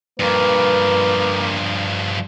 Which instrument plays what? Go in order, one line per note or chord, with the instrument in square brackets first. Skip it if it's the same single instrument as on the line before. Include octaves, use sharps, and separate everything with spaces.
[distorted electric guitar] G2 F3 [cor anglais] A#3 [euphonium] B4